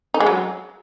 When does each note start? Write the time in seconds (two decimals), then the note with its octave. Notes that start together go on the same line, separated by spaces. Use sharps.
0.14 D#4
0.20 G#3
0.27 F#3